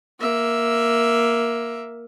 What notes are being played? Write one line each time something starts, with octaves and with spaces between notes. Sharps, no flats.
A#3 E5